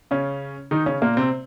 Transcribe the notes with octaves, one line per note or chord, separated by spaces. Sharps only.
C#3 C#4
D#3 D#4
C#3 C#4
A#2 A#3
C3 C4